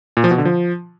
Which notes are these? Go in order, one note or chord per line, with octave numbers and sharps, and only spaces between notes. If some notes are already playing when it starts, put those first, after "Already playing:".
A#2
F3
B2
D3
F3